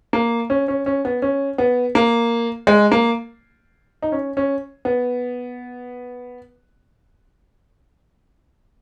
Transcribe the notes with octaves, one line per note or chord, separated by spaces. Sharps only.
A#3
C#4
C#4
C#4
B3
C#4
B3
A#3
G#3
A#3
D#4
C#4
C#4
B3